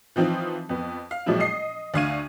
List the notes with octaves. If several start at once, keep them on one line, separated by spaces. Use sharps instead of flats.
E3 F3 C4 D#4 F4
F2 B3
F5
A1 A#2 F3 F#3 G#3 E4
D#5 D#6 C7
D2 D3 F5 C#6 G#6 D#7